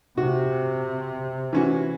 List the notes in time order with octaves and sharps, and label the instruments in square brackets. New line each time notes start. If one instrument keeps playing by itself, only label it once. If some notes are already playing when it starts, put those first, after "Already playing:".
[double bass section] C3 [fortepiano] F#4
[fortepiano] E3 C#4 F#4